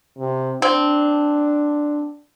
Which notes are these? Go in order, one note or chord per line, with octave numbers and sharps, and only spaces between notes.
C3
C4 D4